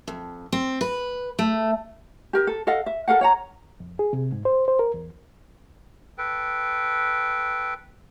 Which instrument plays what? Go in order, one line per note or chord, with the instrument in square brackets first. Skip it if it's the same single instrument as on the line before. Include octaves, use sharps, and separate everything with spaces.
[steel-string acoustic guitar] F2
C4
B4
A3
[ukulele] G4 A#4
A4
A4 D#5 F5 F#5
E5
A4 A#4 F5 F#5
C#5 F#5 A#5
[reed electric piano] F2
G#4
C3
G#2
C5
C5
A#4
E2
[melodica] A4 B4 G5